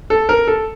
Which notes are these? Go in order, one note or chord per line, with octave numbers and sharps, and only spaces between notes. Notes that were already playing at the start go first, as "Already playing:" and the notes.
A4
A#4
A4